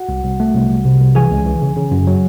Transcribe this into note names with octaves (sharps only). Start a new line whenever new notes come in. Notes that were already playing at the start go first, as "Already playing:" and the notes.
Already playing: F#4 F#5
C2
C2
A3
C2
C2
C3
C2
E3 G#4 G#5
C#2
E3
C#3
C#3
F#2
F#3